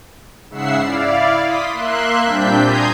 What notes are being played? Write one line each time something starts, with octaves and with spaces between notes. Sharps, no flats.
G#2 C#3 E5 F#5 E6 C7
E4 D5 F5
C6 D6 D#6 B6
A#3 E5 C6 F#6
A#2 G3 C4 D4 G6 B6
G#5 A#5 C6 D#6 G6 G#6